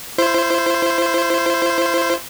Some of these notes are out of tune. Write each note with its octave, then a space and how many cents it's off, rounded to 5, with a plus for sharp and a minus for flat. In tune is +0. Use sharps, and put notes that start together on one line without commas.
E4 +35 C5 +0